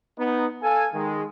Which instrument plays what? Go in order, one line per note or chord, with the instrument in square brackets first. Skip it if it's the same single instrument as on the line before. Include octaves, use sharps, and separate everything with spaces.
[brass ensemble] B3 D#4
A4 F5 G#5
D#3 G#3